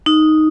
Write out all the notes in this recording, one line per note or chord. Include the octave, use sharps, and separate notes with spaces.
D#4